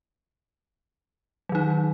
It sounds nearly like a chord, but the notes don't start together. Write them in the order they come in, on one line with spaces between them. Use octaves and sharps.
F#3 D#3 D#4